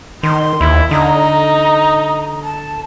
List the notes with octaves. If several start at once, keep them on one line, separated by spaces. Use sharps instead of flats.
D#3 C6
D#2 E4
D3 D#4 A#5
A5